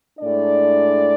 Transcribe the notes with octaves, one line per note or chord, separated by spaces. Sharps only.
A2 G#3 D4 D5